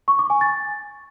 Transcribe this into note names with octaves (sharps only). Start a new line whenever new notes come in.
C#6
D6
G#5
A6